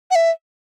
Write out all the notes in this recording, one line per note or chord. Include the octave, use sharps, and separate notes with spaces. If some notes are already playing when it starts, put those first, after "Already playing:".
F#5
E5